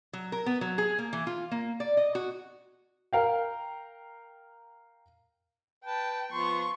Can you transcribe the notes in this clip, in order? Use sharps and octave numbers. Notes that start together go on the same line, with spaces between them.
F#3
A#4
B3
F#3
G#4
A#3
E3
F4
A#3
D5
D#5
F#4
A#4 F5 G5
B4 G5 A5
F3 B3 C6 C#6